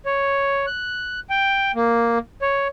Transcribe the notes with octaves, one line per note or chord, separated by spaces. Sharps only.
C#5
F#6
G5
A#3
C#5